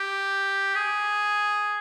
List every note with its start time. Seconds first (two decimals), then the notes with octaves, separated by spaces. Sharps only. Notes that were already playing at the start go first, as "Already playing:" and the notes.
Already playing: G4
0.75 G#4